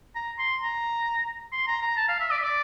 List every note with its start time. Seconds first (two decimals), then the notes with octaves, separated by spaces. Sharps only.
0.15 A#5
0.39 C6
0.61 A#5
1.52 C6
1.67 A#5
1.82 A#5
1.97 A5
2.09 F5
2.20 E5
2.31 D5
2.38 E5
2.43 D5